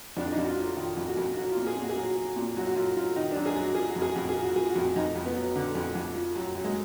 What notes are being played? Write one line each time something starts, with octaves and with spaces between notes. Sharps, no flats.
F2 D4
D4
D#4
F2
F#4
F4
F#3
F4
D#3 F4
F2
F#4
F2
F#3 F#4
F4
A#2
G#4
A#2 F#4
G#4
F#3 F#4
F#3
A#2
F#2 F#4
F#4
F#2 F4
F#3 F4
D#3 D#4
D4
F#2
G#4
F#2 F#4
F3 G#4
F#4
F2
G#4
F2 F#4
G#4
F3
F#4
F3 G#4
F#4
F2
F2 D#4
F2
B3
F#3
D3
F2
F2
F3
F#2
F#2
G#3